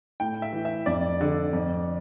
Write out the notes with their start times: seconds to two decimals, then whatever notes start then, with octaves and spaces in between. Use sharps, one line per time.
0.20 A2 G5
0.42 E5
0.53 E3
0.65 E5
0.86 F2 D5
1.21 D3
1.53 F2